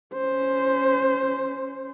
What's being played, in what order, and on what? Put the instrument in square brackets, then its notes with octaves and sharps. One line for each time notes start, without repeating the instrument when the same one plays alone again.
[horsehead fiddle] C#4 C5